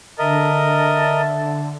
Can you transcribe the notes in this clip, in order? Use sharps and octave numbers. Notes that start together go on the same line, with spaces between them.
D3 A#4 D#5 E5 A5